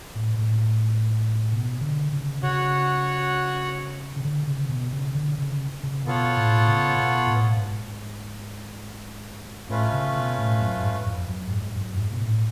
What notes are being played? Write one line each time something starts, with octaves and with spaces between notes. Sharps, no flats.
A2
A2
B2
D3
C#3
C#3 F#4 C#5 F#5
C#3
D3
C#3
B2
C#3
D3
C#3
C#3
B2 B3 F4 A4 C#5 F#5
A2
C#3
B2
A2
G#2
A2 A3 C#4 F4 B4
C#3
B2
A2
F#2
G#2
F2
F#2
G#2
F#2
G#2
B2
A2